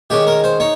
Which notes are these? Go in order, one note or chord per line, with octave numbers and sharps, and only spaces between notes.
D#3 G#3 C#4 G4
A#4
C5
D#4 C#5